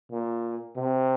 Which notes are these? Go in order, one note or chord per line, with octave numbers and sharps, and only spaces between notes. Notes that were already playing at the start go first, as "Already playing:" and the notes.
A#2
C3